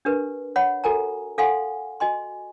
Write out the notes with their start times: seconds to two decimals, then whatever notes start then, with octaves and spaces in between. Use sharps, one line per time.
0.05 D4 G4 A#4 B4
0.56 C#5 F#5 B5
0.84 F#4 A4 A#4 G#5 A#5
1.38 A4 F5 F#5 G#5 C6
2.00 F#4 D#5 G#5 C6